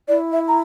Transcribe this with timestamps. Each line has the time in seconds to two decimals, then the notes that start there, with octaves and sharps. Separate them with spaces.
0.08 E4 D5
0.32 E5
0.48 A#5